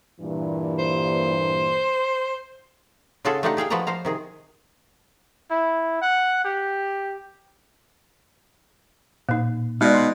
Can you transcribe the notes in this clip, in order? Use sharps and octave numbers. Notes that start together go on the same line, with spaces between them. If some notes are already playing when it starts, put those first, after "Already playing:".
G2 A#2 E3
C5
C#3 C#4 F4 F#4 G#4 A4
A3 D4 D#4 F4 G4 F#5
G4 G#4 F5 G5
F3 F#4 B4 D5 D#5 A#5
F3 C5 F5 A#5
C3 D#3 G#4
E4
F#5
G4
A#2 A#3 D#4
B2 G#3 D#4 D5
C6 F#6